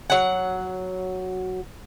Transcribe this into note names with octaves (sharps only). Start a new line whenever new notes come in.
F#3 F#5